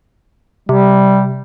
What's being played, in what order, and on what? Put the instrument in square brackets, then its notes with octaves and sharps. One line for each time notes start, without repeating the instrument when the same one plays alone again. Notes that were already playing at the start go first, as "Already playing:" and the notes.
[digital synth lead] C3 [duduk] G3